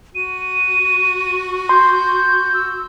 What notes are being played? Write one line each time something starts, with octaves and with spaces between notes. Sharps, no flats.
F#4 D#7
C6 G6
E6